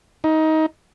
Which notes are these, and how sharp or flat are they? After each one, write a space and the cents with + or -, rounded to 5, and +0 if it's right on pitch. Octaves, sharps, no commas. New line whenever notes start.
D#4 +20